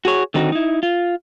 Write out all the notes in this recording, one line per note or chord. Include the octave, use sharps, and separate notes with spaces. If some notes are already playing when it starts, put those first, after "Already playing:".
F#4 G#4 C#5
D3 D#3 C4 D#4 F#4
D#4 E4
F4